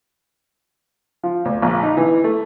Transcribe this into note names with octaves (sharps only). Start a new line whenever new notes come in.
F3
D2
A#1
D#4
E3
A3